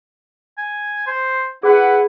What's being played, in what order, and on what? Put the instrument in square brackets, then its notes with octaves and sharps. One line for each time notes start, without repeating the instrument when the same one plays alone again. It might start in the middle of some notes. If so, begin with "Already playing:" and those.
[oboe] G#5
C5
[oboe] E4 [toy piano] G#4 [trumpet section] B4 F#5